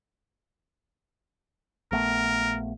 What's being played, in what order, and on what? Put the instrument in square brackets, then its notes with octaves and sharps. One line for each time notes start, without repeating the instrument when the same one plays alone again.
[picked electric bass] A#1 A3 B3 [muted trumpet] A#4